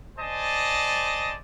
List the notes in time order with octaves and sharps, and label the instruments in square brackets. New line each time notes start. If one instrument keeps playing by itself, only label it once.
[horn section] C5 D5 D#5 G#5 A5